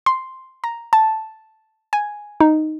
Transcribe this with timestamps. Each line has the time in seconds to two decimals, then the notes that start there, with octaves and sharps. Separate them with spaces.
0.06 C6
0.64 A#5
0.93 A5
1.93 G#5
2.40 D#4